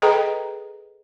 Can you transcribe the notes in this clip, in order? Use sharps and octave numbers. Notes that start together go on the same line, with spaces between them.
G#4 A4 B4 D#5 G5 A#5